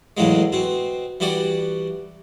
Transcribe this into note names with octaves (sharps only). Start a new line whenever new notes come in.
E2 A2 C#3 E3 F#3 G#3
B2 C4
E3 G3 F#4 D5